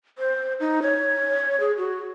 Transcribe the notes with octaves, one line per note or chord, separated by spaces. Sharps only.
C5
D#4
C#5
G#4
F#4